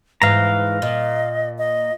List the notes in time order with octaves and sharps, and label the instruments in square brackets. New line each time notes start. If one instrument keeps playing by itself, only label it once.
[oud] G#2 E3 [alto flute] B4 [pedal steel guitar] F5 A#5
[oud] A#2 [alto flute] D#5
[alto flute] D#5